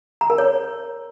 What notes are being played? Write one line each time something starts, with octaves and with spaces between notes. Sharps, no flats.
A#5
A#4
C#5